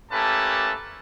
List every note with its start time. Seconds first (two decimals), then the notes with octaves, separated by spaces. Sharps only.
0.11 A3 A#3 C#4 G4 B4 A5